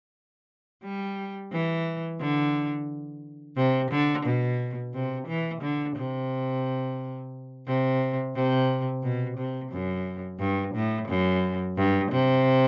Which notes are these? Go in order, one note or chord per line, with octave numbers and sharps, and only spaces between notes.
G3
E3
D3
C3
D3
B2
C3
E3
D3
C3
C3
C3
B2
C3
F#2
G2
A2
F#2
G2
C3